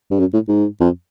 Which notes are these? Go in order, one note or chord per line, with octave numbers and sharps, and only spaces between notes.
G2
F#2
A2
G#2
F2